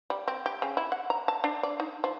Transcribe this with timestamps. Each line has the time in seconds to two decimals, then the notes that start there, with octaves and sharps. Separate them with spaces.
0.10 G3
0.28 C4
0.46 G4
0.62 C#3
0.77 E4
0.92 F#5
1.10 A#5
1.28 A5
1.44 D4
1.63 D5
1.80 D#4
2.04 F3